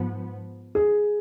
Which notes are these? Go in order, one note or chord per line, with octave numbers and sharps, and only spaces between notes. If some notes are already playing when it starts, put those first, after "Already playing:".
Already playing: G#2 F3 B3
G#4